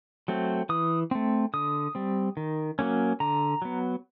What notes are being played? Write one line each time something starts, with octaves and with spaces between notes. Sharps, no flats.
F#3 A3 C4
E3 D#6
A3 C4
D3 D#6
G3 C4
D#3
F#3 A#3 C#4
D3 A#5
F#3 B3